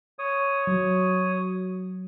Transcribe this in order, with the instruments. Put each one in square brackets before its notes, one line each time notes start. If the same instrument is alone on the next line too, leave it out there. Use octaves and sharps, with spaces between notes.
[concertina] C#5 D#6
[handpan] F#3